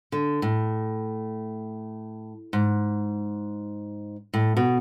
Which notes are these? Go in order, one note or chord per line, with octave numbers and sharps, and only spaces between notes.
D3
A2
G#2
A2
B2